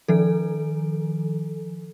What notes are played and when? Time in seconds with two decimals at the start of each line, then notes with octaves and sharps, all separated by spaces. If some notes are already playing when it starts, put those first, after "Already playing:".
0.08 D#3 F3 A4